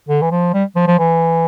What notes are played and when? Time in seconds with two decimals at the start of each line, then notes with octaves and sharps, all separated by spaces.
0.09 D3
0.22 E3
0.31 F3
0.53 G3
0.76 F3
0.87 F3
0.99 E3